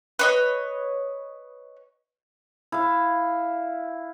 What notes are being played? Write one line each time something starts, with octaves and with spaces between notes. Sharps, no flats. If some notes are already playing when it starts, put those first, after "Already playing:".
B4 C#5 D#5
E4 F5